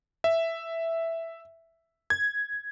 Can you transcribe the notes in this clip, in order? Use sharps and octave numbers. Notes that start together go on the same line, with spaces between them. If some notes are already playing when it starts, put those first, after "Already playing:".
E5
G#6